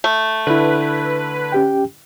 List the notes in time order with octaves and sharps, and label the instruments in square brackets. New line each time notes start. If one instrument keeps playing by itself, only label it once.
[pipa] A3
[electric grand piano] D3 E4 [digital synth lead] B4
[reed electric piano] C#4 G4 G5